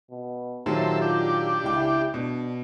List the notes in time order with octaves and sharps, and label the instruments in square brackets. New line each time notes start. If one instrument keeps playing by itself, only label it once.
[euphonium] B2
[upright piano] A#2 D#3 F#3 [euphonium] G4 [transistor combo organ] A4 C5 E5
[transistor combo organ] D4 G4 [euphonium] F4
[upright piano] C#2 G5 [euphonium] E4
[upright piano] B2 [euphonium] D4